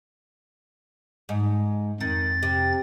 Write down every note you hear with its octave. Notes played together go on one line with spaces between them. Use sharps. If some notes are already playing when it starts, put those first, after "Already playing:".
G#2
F2 D#3 A6
C3